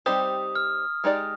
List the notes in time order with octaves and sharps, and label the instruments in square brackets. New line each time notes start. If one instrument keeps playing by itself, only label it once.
[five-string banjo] G3 C4 D#4 G4 C5 [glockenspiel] D#6
[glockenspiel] F6
[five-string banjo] G#3 D#4 G4 D5